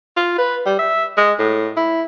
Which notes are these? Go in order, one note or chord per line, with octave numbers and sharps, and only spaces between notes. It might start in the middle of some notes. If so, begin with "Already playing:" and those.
F4
B4
G3
E5
G#3
A2
E4